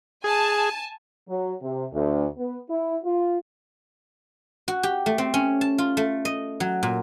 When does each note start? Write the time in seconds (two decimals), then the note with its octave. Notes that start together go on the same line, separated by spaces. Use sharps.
0.24 G#4 G#5 A5
1.28 F#3
1.62 C3
1.92 D2
2.38 B3
2.69 E4
3.03 F4
4.68 F#4
4.83 G4
5.06 A3
5.18 C4
5.34 C#4
5.61 A5
5.78 F4
5.97 A3
6.25 D#5
6.60 F#3
6.83 A#2